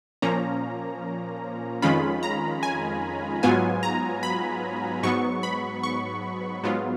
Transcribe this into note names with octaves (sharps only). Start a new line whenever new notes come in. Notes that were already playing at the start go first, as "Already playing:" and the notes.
A#2 F3 A#3 C#4 A#5
F2 D#3 G#3 C#4 F4 B5
A#5
G#5
G#2 F#3 B3 F4 G#5
A#5
B5
G#2 F#3 B3 C#6
B5
C#6
G#2 F#3 B3 F4